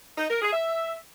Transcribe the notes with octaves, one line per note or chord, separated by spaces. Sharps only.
D#4
A#4
G#4
E5